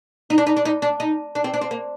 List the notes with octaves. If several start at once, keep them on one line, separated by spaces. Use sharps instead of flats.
D#4
D4
D#4
D4
D#4
D4
D#4
D4
C4
D4
C4
A#3